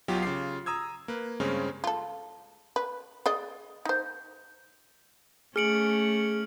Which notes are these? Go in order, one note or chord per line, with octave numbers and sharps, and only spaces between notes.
B1 B2 F#3 F4 G4
C#3 F4 D6 C7
A#5 D#6 E6 G#6
A#3 B4
G2 C#3 G#3 C4 C#4
F4 A4
B4
G#4 D5 D#5
D#4 C5
A3 C#4 G#4 F6 C#7 D7 F#7